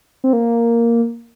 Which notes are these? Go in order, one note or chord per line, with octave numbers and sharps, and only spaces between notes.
C4
A#3